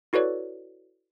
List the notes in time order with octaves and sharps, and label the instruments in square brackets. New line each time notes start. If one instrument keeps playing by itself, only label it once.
[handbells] E4 F#4 A4 B4 C#5 D5